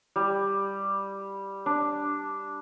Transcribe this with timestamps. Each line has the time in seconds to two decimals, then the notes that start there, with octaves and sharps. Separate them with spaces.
0.16 G3
1.66 D4